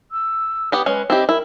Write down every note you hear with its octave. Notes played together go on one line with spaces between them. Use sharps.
E6
B3 G4 F#5 D#6
G#3 C#4 B4
C4 E4 G4 D#5
E4 A#4